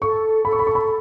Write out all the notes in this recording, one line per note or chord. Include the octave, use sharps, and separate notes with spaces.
A4 C#6
A4 B5
C#6
B5
C#6
B5